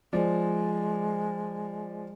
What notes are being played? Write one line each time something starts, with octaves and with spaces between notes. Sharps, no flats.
F3 G#3 D5